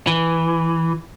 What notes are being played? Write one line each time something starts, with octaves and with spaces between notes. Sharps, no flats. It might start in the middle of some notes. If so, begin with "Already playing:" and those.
E3